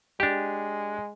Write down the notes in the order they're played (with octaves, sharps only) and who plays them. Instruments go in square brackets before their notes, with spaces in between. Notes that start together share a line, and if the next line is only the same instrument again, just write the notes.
[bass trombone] G#3 [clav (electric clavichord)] D4 G4